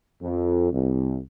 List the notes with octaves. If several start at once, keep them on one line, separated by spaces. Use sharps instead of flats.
F2
C2